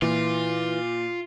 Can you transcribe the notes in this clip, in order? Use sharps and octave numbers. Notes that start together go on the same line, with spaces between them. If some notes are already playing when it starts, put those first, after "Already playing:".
A#2 E3 F4